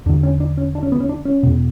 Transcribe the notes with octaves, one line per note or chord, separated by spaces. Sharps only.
E2 D3 D4
C#4
D4
C#4
D4
C#4
B3
C#4
D4
C#4
E2 B2